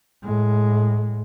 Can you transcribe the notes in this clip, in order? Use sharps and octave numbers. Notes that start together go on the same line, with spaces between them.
A2 G#3